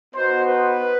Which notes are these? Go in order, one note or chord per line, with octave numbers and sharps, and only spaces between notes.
B3 D#4 F#4 C5
B4